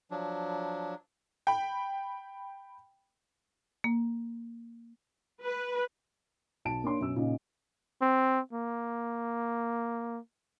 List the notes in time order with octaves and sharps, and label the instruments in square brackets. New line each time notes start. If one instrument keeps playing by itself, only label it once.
[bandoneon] F3 F#3 D4
[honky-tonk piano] G5 B5
[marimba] A#3
[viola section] B4
[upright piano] B1 A5 D7
A#3 D4 C#5 C6
F#2 B2 E6
A#2 C#3 D#4
[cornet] C4
A#3